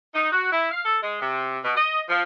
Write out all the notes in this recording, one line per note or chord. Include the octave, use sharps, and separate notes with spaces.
D#4
F#4
E4
F5
A4
G#3
C3
B2
D#5
F3